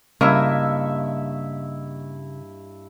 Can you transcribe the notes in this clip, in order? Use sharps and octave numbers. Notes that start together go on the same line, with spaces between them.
G2 C#3 A#3 E4 D#5 E5 C#6